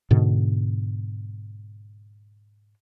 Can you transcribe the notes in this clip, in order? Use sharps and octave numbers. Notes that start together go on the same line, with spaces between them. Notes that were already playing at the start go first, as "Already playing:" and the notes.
G#2 B2 D3